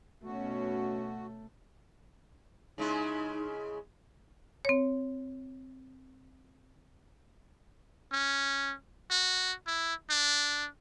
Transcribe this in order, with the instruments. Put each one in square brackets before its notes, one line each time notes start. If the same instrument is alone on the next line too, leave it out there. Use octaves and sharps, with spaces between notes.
[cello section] B2 C#4 [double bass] A3 [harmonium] F#4
[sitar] C#3 G#3 E4 [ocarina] D#4
[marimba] C4 C#5
[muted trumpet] C#4
F#4
E4
D4